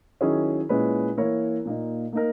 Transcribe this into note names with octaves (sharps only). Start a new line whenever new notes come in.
D#3 F#3 C#4 E4 G#4
A#2 G#3 C#4 E4 B4
E3 A#3 E4 A#4 C#5
A#2 A#3 D#4
A#3 D#4 A#4